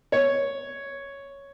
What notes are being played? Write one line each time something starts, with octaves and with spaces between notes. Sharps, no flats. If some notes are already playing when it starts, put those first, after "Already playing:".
C#5